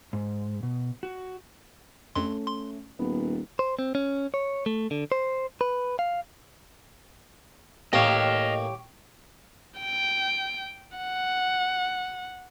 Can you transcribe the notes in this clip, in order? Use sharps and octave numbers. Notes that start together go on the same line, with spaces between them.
G#2
B2
F#4
F2 A3 C#4 C6
C6
D#1 B3
C5
C4
C#4
C#5
A3
D3
C5
B4
F5
A1 A#3 G4 C#5 D#5 F5 G#5
G5
F#5